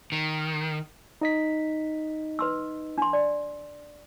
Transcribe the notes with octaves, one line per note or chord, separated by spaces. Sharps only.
D#3
D#4 D#5 B6
B4 C6 E6
D4 C6
D5